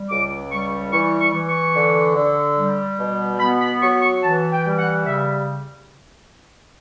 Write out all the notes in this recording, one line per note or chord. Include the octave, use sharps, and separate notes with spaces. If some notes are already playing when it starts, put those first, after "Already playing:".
Already playing: G3
C#2 D6
G3 C#6
E3 C#6
C#6
E3
C#6
D3
D3
G3
B2
B3 B5
B5
F#3 C#6
C#6
E3 A5
G5
G3
F#5
C#3 E5